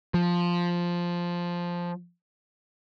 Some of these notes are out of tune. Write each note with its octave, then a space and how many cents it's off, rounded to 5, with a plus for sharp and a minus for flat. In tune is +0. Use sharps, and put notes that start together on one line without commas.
F3 +0